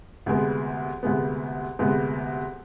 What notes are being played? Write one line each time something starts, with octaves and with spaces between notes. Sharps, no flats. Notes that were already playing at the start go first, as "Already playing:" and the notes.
D2 C3 G#3 B3
D2 C3 G#3 B3
D2 C3 G#3 B3